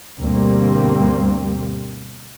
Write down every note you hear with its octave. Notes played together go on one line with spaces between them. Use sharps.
D2 G2 B2 G3 A#3 C4